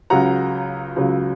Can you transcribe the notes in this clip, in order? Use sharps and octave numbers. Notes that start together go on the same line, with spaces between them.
C#2 C#3 F#3 F#5 A#5
C#2 C#3 F#3